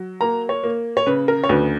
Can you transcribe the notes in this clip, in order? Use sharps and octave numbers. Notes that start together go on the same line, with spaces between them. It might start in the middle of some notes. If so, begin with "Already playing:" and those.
Already playing: F#3
A#3 A#5
C#5
A#3
C#5
C#3 B4
A#4
C#5
D2 B4